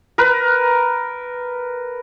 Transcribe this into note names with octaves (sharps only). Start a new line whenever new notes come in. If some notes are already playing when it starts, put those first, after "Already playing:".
A#4 B4